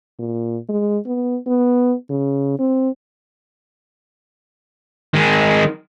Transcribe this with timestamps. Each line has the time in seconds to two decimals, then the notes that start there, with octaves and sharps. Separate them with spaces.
0.19 A#2
0.69 G#3
1.06 B3
1.47 B3
2.10 C#3
2.59 C4
5.14 D#3 G#3